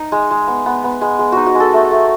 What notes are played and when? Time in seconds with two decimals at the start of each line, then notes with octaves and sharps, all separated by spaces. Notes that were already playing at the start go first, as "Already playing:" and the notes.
Already playing: D#4
0.12 G#3
0.31 G#3
0.47 B3
0.66 B3
0.84 B3
1.01 G#3
1.19 G#3
1.32 D#4 F#4
1.46 F#4
1.55 G#3
1.60 A4
1.73 A3
1.91 A3